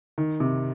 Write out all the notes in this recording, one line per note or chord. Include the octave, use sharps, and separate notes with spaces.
D#3
C3